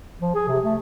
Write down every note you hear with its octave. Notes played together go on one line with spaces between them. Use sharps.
F3
G#4
C3
A3